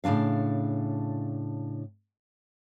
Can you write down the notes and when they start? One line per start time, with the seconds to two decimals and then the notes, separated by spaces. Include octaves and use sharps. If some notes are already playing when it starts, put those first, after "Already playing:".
0.04 A2 C#3 E3 D4 F5